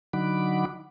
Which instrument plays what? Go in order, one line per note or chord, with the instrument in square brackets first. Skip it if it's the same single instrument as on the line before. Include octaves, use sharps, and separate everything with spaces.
[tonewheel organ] D3 F#3 D#4 F#5 B5 D6